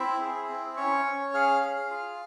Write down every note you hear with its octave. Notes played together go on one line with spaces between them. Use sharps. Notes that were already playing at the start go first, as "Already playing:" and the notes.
Already playing: C4 E4 E5
G#4
C4
C#4 C#5 C#6
C#4
G#4 F5 F6
G#4
F4